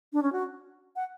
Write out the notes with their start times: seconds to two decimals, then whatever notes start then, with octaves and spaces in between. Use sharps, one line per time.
0.13 D4
0.22 C#4
0.32 F#4
0.96 F#5